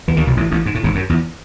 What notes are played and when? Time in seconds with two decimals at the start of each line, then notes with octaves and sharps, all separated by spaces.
0.08 E2 E3
0.17 D#2 D#3
0.27 B1 B2
0.37 A1 A2
0.51 A1 A2
0.66 G#2
0.75 A2
0.83 G#1 G#2
0.95 F#2
1.09 E2